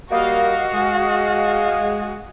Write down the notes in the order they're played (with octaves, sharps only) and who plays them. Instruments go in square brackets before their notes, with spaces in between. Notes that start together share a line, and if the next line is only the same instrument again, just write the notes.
[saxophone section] G3 A#3 [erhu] F#4 [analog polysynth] D#5 F5
[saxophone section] G#3